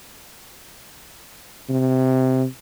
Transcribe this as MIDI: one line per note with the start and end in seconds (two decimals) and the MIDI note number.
1.69 2.44 48